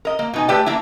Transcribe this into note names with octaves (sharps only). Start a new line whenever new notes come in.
A#4 D#5
A#3
B2 D#4 G#5
A3 G4 B4 D5 G5
A#3 D4 E4